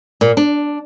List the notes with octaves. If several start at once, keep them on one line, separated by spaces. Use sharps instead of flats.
A#2
D4